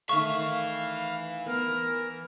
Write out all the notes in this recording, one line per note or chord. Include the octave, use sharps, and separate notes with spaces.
D#3 E3 A3 E5 F5 C#6
B3 A#4